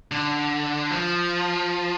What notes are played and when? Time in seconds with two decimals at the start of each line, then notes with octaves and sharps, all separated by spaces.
0.12 D3
0.91 F3